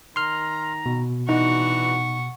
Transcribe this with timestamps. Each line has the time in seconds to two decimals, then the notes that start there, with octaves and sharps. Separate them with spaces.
0.16 D#3 A#5 C6 F6
0.86 B2
1.29 E3 D4 D#4 F#4 F#5 C#6